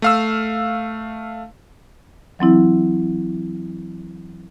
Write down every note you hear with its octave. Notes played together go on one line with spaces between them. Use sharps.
A3 F5 E6
E3 F#3 C4 E4